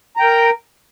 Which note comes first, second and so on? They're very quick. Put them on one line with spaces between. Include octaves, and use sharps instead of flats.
A#5 G5 A#4